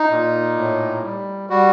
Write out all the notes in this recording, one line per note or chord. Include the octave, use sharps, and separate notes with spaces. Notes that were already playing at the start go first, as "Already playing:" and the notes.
Already playing: D#4
A#2
A2
G3
G3 F#4